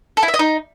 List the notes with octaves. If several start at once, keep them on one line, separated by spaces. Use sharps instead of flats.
A4
E4
E5
D#5
D#4